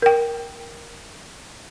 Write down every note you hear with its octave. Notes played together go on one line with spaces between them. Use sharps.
A#4 G5